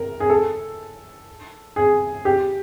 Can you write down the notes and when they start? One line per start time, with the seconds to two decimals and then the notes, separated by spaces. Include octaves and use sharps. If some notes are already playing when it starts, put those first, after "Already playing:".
Already playing: A#4
0.20 G#4
0.30 A4
1.76 G#4
2.25 G4